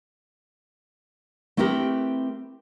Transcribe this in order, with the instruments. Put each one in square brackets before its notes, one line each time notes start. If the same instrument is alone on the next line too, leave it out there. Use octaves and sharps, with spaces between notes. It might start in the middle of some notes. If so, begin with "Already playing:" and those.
[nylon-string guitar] A3 C4 E4 G4 A#4 B4